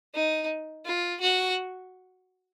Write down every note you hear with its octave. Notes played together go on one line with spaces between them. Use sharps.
D#4
F4
F#4